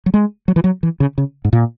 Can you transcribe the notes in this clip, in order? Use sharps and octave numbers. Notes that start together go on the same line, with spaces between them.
F#3
G#3
F#3
E3
F#3
E3
C#3
C#3
G#2
A#2